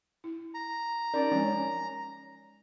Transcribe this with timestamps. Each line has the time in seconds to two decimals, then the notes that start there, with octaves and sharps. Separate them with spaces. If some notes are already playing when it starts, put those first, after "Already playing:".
0.24 E4
0.54 A#5
1.14 C#4 D#4 A#4 D5
1.32 F3 G#3 C#4